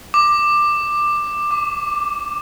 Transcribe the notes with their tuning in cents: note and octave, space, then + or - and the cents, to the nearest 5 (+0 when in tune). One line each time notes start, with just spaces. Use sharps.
D6 +15
D6 -15